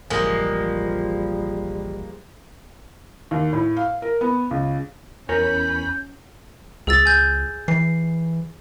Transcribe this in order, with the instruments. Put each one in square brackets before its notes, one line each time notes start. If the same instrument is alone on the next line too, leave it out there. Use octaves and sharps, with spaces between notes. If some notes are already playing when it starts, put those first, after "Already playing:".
[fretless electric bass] E1 A1 D3 [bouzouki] F3 G#3 A#3 [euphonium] G3
[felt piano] D#2
A2
F5
A#4
B3
C#2
[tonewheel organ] E2 B5 [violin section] C#4 [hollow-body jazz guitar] A#4 C#5 G#5 [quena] G6
[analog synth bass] C#2 [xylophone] G#4 E6 A6
[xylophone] G#5 G6 G#6
[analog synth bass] E3 [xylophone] C7